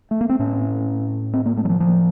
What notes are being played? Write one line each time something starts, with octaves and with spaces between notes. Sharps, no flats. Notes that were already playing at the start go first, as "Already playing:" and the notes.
A3
A#3
C4
A2 C#4
C4
A#3
A3
F#3
F3
F3